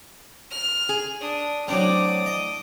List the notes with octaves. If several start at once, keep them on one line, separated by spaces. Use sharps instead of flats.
F6
G#4
D4 D#6
A2 F#3 C4 D4 D5 D6 D#6
D#5